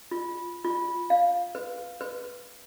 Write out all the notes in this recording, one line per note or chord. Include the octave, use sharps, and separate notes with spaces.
F4
F4
F5
B4
B4